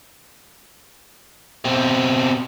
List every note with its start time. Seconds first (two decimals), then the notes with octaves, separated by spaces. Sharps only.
1.65 B2 C4